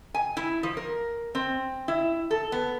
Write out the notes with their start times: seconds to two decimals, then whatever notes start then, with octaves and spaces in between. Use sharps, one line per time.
0.14 G#5
0.37 E4
0.63 F3
0.77 A#4
1.35 C4
1.88 E4
2.31 A4
2.52 B3